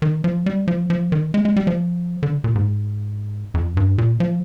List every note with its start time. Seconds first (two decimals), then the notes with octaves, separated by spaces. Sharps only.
0.02 D#3
0.24 F3
0.46 G3
0.68 F3
0.90 F3
1.12 D#3
1.34 G#3
1.45 G#3
1.56 G3
1.67 F3
2.23 D3
2.44 A#2
2.55 G#2
3.54 F2
3.77 G2
3.98 A#2
4.20 F3